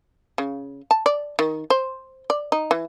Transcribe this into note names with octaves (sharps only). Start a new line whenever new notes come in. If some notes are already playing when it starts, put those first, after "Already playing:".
C#3
A5
D5
D#3
C5
D5
D#4
E3